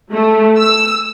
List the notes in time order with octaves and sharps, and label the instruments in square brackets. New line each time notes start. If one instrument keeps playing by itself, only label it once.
[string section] A3
E6